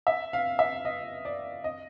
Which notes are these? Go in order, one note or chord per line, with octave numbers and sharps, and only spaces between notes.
E5
F5
E5
D#5
D5
D#5